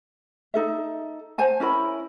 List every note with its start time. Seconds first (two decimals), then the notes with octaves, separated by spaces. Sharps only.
0.54 D#4 A4 E5
1.38 C5 G#5 A5
1.60 C#4 E4 A#4 B5